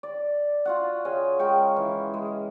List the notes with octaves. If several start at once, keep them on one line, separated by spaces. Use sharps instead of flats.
D5
F4 F#4 F#5
C#3 C#4 D#5 G#5
G#3 A#4 G5 C#6
E3
G#3